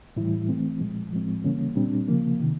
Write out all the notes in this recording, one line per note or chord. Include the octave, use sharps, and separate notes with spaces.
A2 E3 G3 E4
E3 A3 C4
A#2 F3 G#3
A2 F3 G#3 C4
C#3 E3 G3 A#3 C#4
A#2 G3 C4 D4
C#3 F3 A#3
C3 D#3